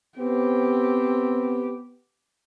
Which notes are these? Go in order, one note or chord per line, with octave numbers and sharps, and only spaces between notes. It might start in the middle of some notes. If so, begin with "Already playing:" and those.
B3 C4 G4